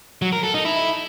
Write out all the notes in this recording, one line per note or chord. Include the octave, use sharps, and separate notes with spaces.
F#3
A#4
A4
D#4
E4